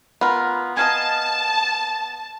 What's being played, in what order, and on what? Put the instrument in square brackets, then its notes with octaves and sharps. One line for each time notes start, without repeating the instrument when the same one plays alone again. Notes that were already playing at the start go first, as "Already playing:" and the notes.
[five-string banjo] B3 [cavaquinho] F4 A#4
[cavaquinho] D#5 F5 G#5 [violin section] A5